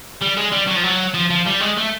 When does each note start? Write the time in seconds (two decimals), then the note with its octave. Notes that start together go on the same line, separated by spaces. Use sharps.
0.22 G3
0.37 G#3
0.52 G3
0.68 F#3
0.77 F3
0.84 F#3
1.14 F3
1.30 F3
1.46 G3
1.61 G#3
1.77 A3